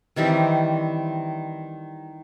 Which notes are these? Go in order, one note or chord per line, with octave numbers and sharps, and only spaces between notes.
D#3 E3 G3 C4